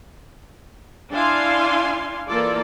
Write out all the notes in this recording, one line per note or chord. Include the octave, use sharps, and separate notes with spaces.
D4 E4 F5 G#5 C6
E3 A#3 F4 A4 D5